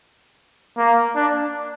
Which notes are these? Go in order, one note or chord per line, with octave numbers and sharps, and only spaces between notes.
A#3
D4